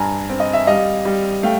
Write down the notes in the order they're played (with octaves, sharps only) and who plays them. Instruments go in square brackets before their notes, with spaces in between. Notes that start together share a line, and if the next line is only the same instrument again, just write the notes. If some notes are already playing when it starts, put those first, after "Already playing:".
Already playing: [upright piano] G2 G#5 A#5
C4
D#5
E5
G3 D#5 F5
G3
A3 F5 G5